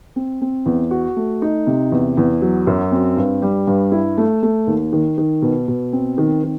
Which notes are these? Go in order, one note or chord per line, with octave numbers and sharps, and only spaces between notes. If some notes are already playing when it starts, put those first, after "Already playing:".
C4
C4
E2
F#4
A3
D#4
C3
E2
E2
F#3
F#2
C4
G2
G3
G2
E4
A3
A3
D#2
D#3
D#3
B2
B2
C4
D#3
D#3